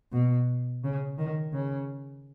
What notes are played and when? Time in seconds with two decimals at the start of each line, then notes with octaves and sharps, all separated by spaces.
0.12 B2
0.84 C#3
1.18 D#3
1.54 C#3